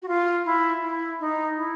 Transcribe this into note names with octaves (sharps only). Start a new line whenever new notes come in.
F#4
F4
E4
E4
D#4
E4